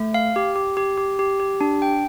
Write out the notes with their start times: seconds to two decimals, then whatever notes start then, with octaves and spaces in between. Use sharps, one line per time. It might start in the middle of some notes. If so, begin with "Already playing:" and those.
Already playing: A3
0.14 F5
0.36 G4
0.56 G4
0.77 G4
0.97 G4
1.19 G4
1.40 G4
1.61 D4
1.82 G5